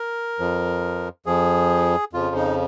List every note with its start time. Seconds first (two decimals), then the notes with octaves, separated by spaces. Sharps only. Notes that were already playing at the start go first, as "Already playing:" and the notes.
Already playing: A#4
0.39 F2 F3
1.26 F2 F3 G#4
2.13 F2 C#3 F3 F4
2.36 D#4